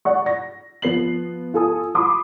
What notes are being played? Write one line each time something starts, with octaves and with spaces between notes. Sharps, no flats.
D5 F#5 C#6
A#6
F3 B3 C7 F#7
F4 A4 G#5 D#6
B5 C6 D6 D#6